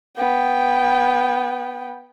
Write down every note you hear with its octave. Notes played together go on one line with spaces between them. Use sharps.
B3 G5